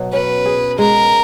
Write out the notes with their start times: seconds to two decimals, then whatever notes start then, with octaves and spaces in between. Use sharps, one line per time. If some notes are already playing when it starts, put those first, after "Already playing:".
Already playing: B2 F#3
0.13 C#4 B4
0.45 G#4
0.78 G#3 A#4